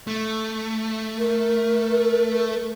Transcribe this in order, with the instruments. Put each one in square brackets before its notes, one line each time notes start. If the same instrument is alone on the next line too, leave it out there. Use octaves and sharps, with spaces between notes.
[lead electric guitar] A3
[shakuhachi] A#4